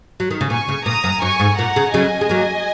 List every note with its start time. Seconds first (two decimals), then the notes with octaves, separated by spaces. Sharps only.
0.20 F#3
0.30 D#3
0.41 C#3
0.50 A#2 G#5 C#6
0.68 C#3
0.86 A#2 A#5 D#6
1.04 F#2
1.22 F#2 G#5 C#6
1.39 G#2
1.58 A#2 F#5 A#5
1.76 C#3
1.94 C#3 F#3 D#5 G#5
2.21 G#3
2.29 F#3 A#3